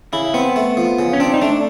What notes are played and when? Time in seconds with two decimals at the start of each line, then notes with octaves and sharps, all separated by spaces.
0.13 C#3 E4
0.34 B3 C4
0.56 A3
0.77 F3
0.99 C#3
1.13 C#4
1.20 C4 D4
1.34 D#4
1.42 A3 D4